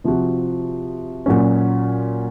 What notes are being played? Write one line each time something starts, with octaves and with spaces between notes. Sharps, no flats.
C3 F3 C4 F#4
A#2 F#3 C#4